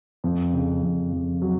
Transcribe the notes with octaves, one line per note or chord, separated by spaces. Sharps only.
F2
C#3
F2
F2
F#3